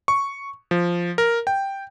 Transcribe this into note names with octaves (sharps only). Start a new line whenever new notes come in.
C#6
F3
A#4
G5